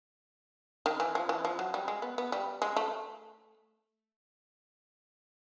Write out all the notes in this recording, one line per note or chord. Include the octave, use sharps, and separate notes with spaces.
D#3
E3
F3
E3
F3
F#3
G3
G#3
B3
B3
G3
G#3
A3